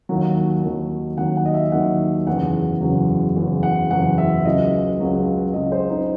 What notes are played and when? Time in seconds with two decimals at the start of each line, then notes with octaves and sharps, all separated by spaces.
0.09 D#2 D#3 F#3
0.64 D#2 D#3 F#3
1.18 D#2 D#3 F#3 F#5
1.37 F#5
1.46 D#5
1.54 E5
1.72 D#2 D#3 F#3 F#5
2.27 F#1 E2 C#3 F#3 F#5
2.81 F#1 E2 C#3 F#3
3.36 F#1 E2 C#3 F#3
3.63 F#5
3.90 F#1 E2 C#3 F#3 F#5
4.18 E5
4.45 C#2 C#3 F#3 D#5
5.00 C#2 C#3 F#3
5.54 C#2 C#3 F#3 D#5
5.72 C5
5.90 D#4